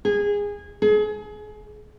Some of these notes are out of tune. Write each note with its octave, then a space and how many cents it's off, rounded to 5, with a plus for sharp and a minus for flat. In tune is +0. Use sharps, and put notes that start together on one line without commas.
G#4 -20
G#4 +30